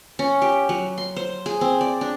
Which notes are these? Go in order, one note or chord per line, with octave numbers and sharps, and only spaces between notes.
C#4
G4
F#3
C6
C5
G#4
C4
D5
D4